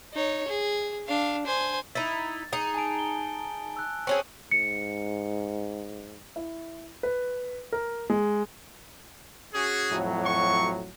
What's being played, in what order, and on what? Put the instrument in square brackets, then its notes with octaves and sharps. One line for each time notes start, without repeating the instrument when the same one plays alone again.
[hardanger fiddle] D#4 C#5
G#4
D4 F5
C5 G#5
[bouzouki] D#4 E4 [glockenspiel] A6
[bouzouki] D#4 G#4
[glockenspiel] G#5 A5 D7
G#5 G7
E6 F#6
[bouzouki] C4 C#4 G#4 [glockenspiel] C#6 C#7 F#7
[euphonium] G#2 [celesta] C#7
[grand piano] E4
B4
A#4
G#3
[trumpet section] C#4 F#4 G#4
[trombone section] F2 A2 F#3
[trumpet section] C#6